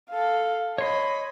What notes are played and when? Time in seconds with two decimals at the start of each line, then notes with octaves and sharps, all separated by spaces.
0.10 A4 F5
0.78 C#5 D#5 B5 C6